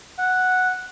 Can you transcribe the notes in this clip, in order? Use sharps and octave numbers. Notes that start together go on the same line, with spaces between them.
F#5